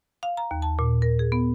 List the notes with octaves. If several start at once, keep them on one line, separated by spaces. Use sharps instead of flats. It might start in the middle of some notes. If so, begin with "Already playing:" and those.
F5
A#5
D#2
A5
A#2
A#4
G#4
B3